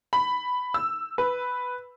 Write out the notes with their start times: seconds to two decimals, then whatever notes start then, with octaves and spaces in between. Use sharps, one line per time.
0.13 B5
0.74 E6
1.18 B4